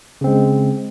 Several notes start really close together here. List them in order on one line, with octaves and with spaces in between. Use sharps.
C#3 C4 G#3